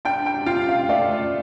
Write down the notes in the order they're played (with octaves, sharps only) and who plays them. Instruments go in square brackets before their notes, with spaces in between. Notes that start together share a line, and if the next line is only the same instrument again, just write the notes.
[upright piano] D4 [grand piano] G5
[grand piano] G5
[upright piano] F4 [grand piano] G5
[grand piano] F5
[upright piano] A3 [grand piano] D5